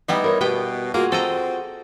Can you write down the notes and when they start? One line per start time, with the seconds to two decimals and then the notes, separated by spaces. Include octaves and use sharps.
0.08 G3 B3 D#4 E4
0.24 A#4 C5 C#5
0.41 B2 B3 G4 G5
0.94 A#3 F4 F#4 G#4 A#5
1.12 C4 A4 D#5 A#5